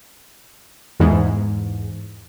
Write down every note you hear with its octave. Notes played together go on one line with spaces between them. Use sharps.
E2 G#2